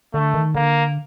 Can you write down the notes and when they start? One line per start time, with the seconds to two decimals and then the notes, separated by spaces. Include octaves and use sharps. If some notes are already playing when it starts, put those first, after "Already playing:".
0.14 D3 A3
0.34 D#3
0.55 D3 A#3